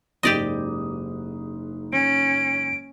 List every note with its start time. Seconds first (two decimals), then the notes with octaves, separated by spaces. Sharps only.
0.23 F#1 G#2 G4 D5 D#5 D#6
1.93 C#4 D7